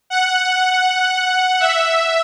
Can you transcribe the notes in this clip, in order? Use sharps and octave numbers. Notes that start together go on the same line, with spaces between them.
F#5
E5